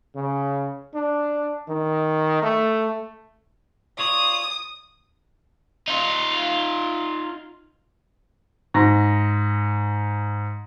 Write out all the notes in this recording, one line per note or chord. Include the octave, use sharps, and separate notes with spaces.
C#3
D4
D#3
A3
F4 C#5 D5 D#6
D#4 F4
G#2 A#6